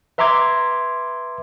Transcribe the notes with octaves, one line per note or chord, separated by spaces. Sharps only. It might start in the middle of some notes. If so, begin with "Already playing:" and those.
B4 E5 A#5 C6 D6 G#6